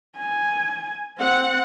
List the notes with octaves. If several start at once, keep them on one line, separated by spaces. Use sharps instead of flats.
G#5
C4 F#5